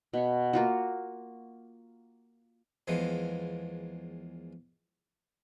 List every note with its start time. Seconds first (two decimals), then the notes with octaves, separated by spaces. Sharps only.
0.14 B2 C#5
0.53 A#3 F4 F#4
2.88 E2 F3 G#3 A#3 B3